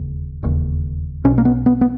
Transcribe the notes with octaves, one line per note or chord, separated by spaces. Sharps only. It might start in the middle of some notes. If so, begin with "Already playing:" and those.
Already playing: E1 D#2 C#3
E1 D#2 C#3
B1 B2 C#4
A#3
B3
B3
B3